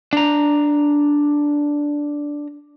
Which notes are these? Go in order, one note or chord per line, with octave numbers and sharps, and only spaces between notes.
D4 A#5